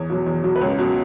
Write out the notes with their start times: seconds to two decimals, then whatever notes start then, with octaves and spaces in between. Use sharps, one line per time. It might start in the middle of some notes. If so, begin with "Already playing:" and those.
Already playing: E2 C#5
0.10 B2 F#3
0.26 E2
0.44 B2 F#3
0.56 B4
0.61 C#2 C#5
0.79 B2 F#3